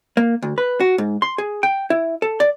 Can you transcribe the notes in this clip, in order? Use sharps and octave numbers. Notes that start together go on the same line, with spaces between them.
A#3
D2
B4
F#4
G#2
C6
G#4
G5
E4
A4
D5